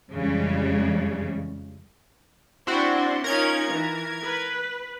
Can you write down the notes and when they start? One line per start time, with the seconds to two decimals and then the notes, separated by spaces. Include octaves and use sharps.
0.12 F2 C#3 E3 G3 G#3
2.67 C4 D4 E4 F#4 C6
3.24 C#4 D#4 F4 A#4 G#6
3.71 E3
4.23 B4